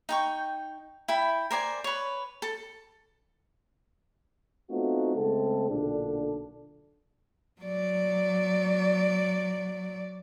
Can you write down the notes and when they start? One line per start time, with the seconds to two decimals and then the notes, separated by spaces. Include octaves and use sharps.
0.09 D#4 G5 C#6
1.08 E4 G5 B5
1.51 A#4 C5 D5 G#5
1.84 B4 C#5
2.42 A4
4.71 A3 B3 C4 D#4 F4 F#4
5.16 C#3 G#3 A3 C4 A4
5.70 B1 A#2 D3 D4 A4
7.61 F#3 D5